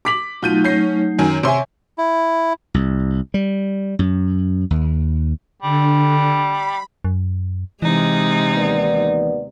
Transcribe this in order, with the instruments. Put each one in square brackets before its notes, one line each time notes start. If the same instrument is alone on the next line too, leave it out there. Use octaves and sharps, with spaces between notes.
[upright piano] D6 B6 F#7
[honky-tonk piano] B2 G6 D#7 [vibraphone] F#3 A3 D#4 [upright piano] F4
[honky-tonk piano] C#4 C7 [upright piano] G6 A#6
[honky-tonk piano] F#2 D#3 G#5
[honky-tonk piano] C3 C6 [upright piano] C#5 E5 G#5
[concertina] E4
[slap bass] C2
G3
F#2
D#2
[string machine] D3 [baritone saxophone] G3
[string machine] B5
[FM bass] F#2
[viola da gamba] C3 G#3 [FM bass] E3 [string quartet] D#4
[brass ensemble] D#2 B3 D5